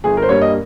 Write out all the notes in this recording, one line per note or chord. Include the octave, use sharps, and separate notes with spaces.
G1 G#4
A#4
C5
G2 G3 A#3 C#5
D#5